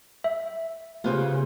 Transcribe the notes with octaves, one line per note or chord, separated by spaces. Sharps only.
E5
C#3 A3 B3 F4 G4 B4 C5